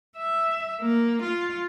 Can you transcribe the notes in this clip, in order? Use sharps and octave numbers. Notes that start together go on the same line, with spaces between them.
E5
A#3
F4